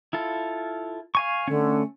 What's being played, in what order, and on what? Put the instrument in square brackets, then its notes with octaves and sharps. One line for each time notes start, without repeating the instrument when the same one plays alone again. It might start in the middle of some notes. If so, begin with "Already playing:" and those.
[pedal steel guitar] E4 F4 A4
F5 G#5 C#6
[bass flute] D3 [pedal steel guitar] A3 C#4